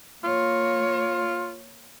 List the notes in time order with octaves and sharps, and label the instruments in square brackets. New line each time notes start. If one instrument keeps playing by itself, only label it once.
[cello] A#3 C#5 [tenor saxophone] F4